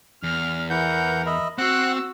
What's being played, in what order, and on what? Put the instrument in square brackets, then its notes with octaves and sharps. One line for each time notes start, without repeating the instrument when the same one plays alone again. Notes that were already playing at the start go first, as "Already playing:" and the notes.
[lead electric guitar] E2 [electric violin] F6
[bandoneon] E3 F#5 G6 [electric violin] A#4
[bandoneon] D#5 E5 B5
[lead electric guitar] C4 [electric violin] F#4 E6 [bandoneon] F#5 F#6